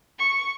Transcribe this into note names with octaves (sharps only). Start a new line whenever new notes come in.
C#6